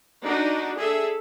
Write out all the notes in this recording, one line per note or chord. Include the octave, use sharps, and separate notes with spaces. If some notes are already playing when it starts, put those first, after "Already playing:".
D4 D#4 F#4
G#4 A4 E5